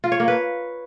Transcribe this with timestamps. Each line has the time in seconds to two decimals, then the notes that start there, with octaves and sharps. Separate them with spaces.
0.04 F4
0.12 C#5
0.20 A#3
0.28 B4